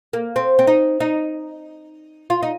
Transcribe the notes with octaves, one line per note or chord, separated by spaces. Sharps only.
A#3
C4
C4
D#4
D#4
F4
D#4